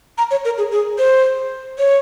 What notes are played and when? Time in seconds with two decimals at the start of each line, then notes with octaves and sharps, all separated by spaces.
0.18 A#5
0.31 C#5
0.45 A#4
0.58 G#4
0.71 G#4
0.98 C5
1.79 C#5